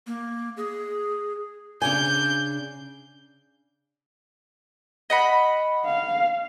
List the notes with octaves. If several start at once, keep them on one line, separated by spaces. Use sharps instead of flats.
A#3
G#4
C#3 D4 G#5 G6
D#5 F#5 B5
F5